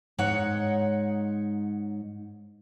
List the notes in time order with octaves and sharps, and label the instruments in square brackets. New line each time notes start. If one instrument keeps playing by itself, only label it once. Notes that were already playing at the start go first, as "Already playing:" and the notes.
[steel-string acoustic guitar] G#2 D#4 C#5 F#5